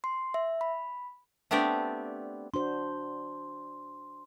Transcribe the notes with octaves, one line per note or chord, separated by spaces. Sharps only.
C6
E5
B5
A3 B3 C4 D4 G4 D5
D4 F#4 C5 C6